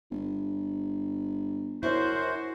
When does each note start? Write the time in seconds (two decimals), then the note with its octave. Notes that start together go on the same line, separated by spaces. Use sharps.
0.11 G1
1.83 F#2 E4 F#4 C5